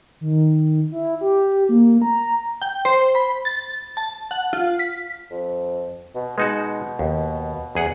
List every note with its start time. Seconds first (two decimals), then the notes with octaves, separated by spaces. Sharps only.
0.21 D#3
0.92 E4
1.21 G4
1.69 A#3
2.02 A#5
2.62 G5
2.85 C5
3.15 B5
3.45 A6
3.97 A5
4.31 F#5
4.53 F4
4.79 B6
5.31 F2
6.15 B2
6.38 B2 G#3 D#4 F#4
6.99 D#2
7.75 E2 G#4 F#5